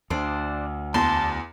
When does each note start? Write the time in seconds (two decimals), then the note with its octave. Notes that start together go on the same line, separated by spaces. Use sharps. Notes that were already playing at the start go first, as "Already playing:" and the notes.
0.10 D2 D4 C5
0.94 E2 A5 C6